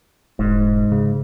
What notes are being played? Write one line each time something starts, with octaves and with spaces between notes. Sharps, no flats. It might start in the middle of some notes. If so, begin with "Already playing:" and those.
E1 G#2
C#3